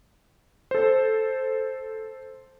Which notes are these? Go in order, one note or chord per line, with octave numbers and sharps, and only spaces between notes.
A4 C5